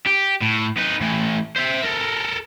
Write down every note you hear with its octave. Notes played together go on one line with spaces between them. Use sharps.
G4
A2
D#4 B4
A2 E3
C5 E5
A4 A#4